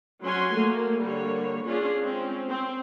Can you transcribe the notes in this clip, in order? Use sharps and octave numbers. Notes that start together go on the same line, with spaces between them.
F#3 C#4 F#4 G#5 C6
A3 A#3
D3 G3 A#3 C#5
C#4 D4 F4 G#4
G#3 C4 C#4
C4